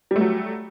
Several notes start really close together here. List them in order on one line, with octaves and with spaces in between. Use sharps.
G3 A3 F#3